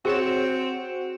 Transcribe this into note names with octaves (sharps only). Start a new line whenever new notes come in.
C4 F#4 G#4 C#5 C#7 E7